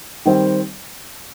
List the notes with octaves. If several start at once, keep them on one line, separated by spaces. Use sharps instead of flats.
D#3 G3 C4